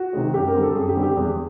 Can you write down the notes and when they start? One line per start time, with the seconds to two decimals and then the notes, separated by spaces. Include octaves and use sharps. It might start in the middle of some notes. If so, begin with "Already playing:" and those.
Already playing: F#4
0.13 C3 D#3 G#3
0.34 F#2 G4
0.48 A#4
0.54 D3 G3 C4
0.62 A4
0.75 F#2 G#4
0.89 G4
0.95 D3 G3 C4
1.03 G4
1.16 E2 G#4